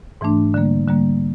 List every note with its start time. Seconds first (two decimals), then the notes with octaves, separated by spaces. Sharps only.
0.21 G#2 E3 A3 D4
0.54 D3 G3 A#3
0.88 D3 G3 A#3